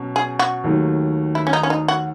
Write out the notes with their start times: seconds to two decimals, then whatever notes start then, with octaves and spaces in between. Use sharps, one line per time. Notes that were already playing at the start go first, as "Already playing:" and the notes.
Already playing: B2 F#3 C#4
0.16 G#4
0.39 F#4
0.64 D#2 D#3 F#3 A3
1.35 E4
1.47 C#4
1.53 D#4
1.63 C#4
1.70 D#4
1.88 F#4